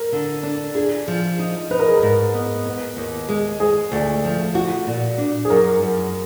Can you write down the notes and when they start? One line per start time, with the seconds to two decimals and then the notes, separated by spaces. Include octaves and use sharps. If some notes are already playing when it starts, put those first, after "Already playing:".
Already playing: A#4
0.12 D3
0.43 D4
0.75 G#4
1.08 F3
1.39 D#4
1.71 D#4 B4
1.79 A#4
1.88 G#4
1.97 A#4
2.02 G#2
2.34 B3
2.66 B3
2.97 D#2
3.29 G#3
3.60 G#3 G#4
3.92 D2
4.24 F3
4.55 F#4
4.87 A#2
5.18 D4
5.45 G#4
5.50 F#2 A#4
5.82 F#2